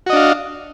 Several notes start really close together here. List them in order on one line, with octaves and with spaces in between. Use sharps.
F#4 D#5 D4 F5